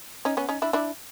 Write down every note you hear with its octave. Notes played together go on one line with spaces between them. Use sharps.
C#4 D#4
B3 C#4
C#4 D#4
D4 E4
D4 E4